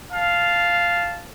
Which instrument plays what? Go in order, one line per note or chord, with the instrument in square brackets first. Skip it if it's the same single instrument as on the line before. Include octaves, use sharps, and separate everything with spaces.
[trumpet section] F5 A5